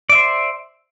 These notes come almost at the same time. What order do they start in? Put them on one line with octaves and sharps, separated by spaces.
D5 E5 C5